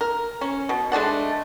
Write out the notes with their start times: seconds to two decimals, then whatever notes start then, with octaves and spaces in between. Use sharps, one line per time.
0.01 A#4
0.41 C#4
0.69 B2
0.92 G#3 A3 D4 F#5